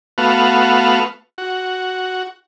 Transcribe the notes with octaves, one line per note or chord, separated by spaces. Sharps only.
A3 B3 F#4 F5
F#4